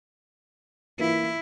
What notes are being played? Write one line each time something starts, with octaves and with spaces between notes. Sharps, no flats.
E3 A#3 E4 F4